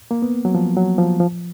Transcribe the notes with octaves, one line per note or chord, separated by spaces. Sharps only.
A#3
B3
F#3
F3
F#3
F3
F3